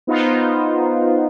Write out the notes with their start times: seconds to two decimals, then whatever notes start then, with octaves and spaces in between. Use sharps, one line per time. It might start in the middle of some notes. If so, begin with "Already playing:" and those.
0.07 B3 D#4 F4 C5